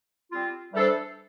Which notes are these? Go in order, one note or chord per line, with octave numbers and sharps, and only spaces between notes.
G3 C4 F4
E3 G3 D4 A4 C5